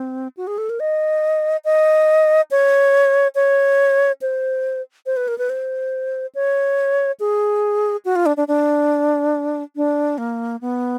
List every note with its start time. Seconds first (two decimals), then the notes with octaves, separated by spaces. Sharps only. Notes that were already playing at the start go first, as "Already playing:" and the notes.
Already playing: C4
0.37 F#4
0.47 G#4
0.58 A4
0.69 A#4
0.80 D#5
1.65 D#5
2.51 C#5
3.35 C#5
4.22 C5
5.06 C5
5.17 B4
5.28 A#4
5.38 B4
5.50 C5
6.35 C#5
7.20 G#4
8.05 F#4
8.16 F4
8.26 D4
8.37 D4
8.48 D4
9.76 D4
10.18 A#3
10.61 B3